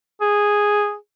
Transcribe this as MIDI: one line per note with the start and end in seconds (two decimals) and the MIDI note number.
0.21 0.95 68